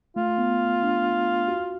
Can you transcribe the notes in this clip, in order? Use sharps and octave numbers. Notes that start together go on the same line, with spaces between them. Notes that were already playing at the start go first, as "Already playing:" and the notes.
A3 F4
B3
D4
F#4